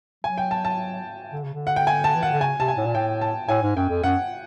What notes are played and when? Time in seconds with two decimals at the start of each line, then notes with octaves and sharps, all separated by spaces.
0.24 F#3 G#5
0.38 G5
0.51 A5
0.65 A5
1.33 D3
1.43 C#3
1.54 D3
1.67 F#5
1.76 G5
1.87 G#5
2.04 A5
2.15 E3
2.23 D#3 F#5
2.32 D3
2.41 C#3 G#5
2.59 C3 A5
2.68 G#5
2.77 A2
2.86 A#2
2.95 A2 G5
3.21 A5
3.49 A2 G#5
3.62 G#2
3.76 F#2 G5
3.90 F2
4.03 F#2 F#5